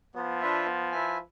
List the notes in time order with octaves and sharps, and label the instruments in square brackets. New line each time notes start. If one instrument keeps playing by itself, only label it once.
[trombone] F3 [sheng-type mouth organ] B3
[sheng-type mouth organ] D4 F4 B4 E5
B3
E4 B4 E5 G#5